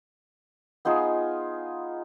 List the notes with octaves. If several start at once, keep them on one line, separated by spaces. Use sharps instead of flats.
B3 D#4 F4 G#4